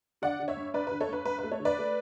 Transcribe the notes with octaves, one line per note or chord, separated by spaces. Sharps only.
D3 D5 F#5
D3
C#5 E5
G2
G2 B4 D5
B4
D3
A4 C#5
G2 B4
G2 B4
B4
A3
A4 C#5
D3
B4 D5
A3